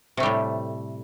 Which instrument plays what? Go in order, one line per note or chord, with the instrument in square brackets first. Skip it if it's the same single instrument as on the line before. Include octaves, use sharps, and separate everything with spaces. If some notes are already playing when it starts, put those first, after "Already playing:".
[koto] C3
A3
G3
A2